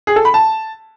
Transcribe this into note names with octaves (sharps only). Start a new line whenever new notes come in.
G#4
A4
B5
A5